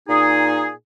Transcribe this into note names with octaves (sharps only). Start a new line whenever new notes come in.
A#2 D#4 G#4